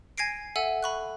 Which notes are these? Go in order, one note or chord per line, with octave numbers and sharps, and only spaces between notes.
G#5 G#6 A#6 C7 D7
A4 E5 F#5 G#5 E6
B5 C#6 F#6